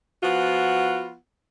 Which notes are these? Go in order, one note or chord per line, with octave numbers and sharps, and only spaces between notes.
F3 B3 F4 F#4